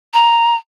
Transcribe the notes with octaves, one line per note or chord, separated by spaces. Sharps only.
A#5